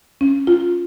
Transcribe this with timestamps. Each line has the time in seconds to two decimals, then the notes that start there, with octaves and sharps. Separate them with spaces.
0.21 C#4
0.47 F4